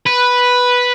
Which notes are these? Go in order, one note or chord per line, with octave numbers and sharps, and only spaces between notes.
B4